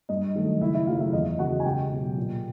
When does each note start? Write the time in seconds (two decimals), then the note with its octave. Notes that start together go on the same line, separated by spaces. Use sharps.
0.09 G2 D#5
0.35 D#3 F#3 A3
0.61 C#2 E4 E5
0.74 E4 E5
0.87 C#3 F#3 A3 F4 F5
1.00 E4 E5
1.13 E2 D#5
1.39 C#3 E3 F#4 F#5
1.60 G#5
1.65 C#2 G4 G5
1.91 B2 F#3
2.17 A#2